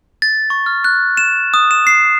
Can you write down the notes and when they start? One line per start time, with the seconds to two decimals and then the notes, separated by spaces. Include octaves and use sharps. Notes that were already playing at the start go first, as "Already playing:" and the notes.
0.22 A6
0.50 C#6
0.66 F6
0.84 F#6
1.17 E7
1.54 D#6
1.71 E7
1.87 C7